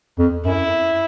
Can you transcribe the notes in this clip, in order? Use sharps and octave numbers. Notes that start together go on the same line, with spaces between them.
F2
F#2 E4